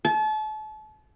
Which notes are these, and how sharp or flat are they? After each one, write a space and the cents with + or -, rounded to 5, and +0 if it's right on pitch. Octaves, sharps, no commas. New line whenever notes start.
A5 -35